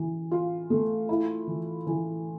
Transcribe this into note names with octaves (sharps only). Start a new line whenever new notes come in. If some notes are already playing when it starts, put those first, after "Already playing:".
Already playing: E3
F4
A3
E4
E3
E3